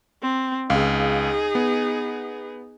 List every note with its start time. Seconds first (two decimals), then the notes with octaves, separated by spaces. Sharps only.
0.22 C4
0.70 C#2 D#4 G#4 F5
1.55 B3